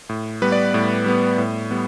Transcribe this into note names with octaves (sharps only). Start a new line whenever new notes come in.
A2
G3 B3 B4
D5
A2
G3 B3
A2
G3 B3